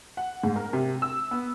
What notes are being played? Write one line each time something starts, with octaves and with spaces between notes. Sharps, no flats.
F#5
G#2
A#4
C3
E6
B3